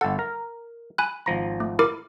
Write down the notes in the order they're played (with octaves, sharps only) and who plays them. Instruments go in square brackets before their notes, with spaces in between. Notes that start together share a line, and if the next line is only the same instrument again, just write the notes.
[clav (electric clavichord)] G1 A4 [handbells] F#5
[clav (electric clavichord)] A#4
[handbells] G#5 B5 F#6
[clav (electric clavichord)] G#1 F3 A#5
[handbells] A3
E4 A#4 D6